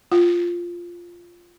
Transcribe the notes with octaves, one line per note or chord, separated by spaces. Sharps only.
F4